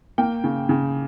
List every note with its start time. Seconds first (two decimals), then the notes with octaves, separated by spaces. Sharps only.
0.18 A#3 G5
0.44 C#3
0.69 C#3